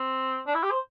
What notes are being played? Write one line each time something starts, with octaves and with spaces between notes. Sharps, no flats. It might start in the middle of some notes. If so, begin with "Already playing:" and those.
Already playing: C4
D4
E4
G4
C5